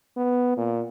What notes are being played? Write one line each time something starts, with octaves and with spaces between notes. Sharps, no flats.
B3
A#2